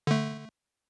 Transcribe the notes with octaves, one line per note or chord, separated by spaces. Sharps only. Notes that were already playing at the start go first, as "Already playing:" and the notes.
D3 A3